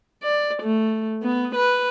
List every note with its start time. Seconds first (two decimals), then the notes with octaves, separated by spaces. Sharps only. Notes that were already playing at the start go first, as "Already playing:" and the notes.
0.23 D5
0.63 A3
1.23 B3
1.56 B4